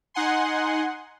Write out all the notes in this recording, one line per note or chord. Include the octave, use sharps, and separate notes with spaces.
D#4 F#5 G#5 C6